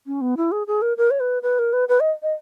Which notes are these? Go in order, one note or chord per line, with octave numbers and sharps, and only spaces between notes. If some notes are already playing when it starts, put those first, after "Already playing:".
C#4
B3
E4
G#4
G#4
A#4
A#4
C#5
B4
B4
A#4
B4
B4
D#5
D#5